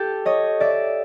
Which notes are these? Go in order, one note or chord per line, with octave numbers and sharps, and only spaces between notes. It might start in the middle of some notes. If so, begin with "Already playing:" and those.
Already playing: G4 A4
C#5 D#5
D5 E5